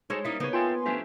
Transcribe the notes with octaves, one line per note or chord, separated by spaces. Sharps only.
G#3 D#4 F#4 A4 C5 C#5
G3 A#3 C#4 D#4 E4
C#3 B3 D#4 G#4 C#5
F4 A4 E5 G5 G#5 C6
F3 A3 C#4 D4 G4 E5